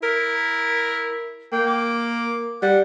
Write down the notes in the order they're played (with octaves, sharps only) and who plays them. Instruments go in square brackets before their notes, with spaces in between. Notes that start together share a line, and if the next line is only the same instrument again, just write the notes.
[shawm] E4 [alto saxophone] A#4
[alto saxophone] A#3 [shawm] G5
[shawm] D6
[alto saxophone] G3 [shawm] F#5